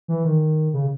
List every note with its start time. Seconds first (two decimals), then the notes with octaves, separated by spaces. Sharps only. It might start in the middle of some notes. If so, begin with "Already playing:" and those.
0.08 E3
0.25 D#3
0.73 C#3